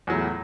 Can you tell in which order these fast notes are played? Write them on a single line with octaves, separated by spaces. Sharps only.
E2 F#3 A2